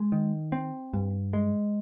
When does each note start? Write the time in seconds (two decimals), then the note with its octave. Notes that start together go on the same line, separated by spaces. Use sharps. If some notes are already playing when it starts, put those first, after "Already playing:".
Already playing: G#3
0.12 D#3
0.52 C4
0.93 G2
1.33 G#3